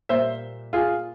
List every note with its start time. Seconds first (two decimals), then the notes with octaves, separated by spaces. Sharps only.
0.09 A#2 G3 A#3 C5 E5
0.73 F4 G#4